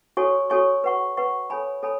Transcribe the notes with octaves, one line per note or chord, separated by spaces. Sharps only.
F#4 A4 C#5 G#5 C#6
F#4 A4 C#5 G#5 C#6
B4 F#5 C#6
B4 F#5 C#6
A4 C#5 G#5 B5
A4 C#5 G#5 B5